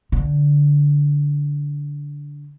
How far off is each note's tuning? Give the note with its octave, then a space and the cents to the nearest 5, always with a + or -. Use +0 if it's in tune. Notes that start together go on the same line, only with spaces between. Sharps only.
D3 -15